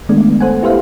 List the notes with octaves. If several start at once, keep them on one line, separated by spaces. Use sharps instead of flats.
D#3 G#3 A3 B3 D4
A4 C5 F#5 G#5
E4 G4 B4 C5 E5 F5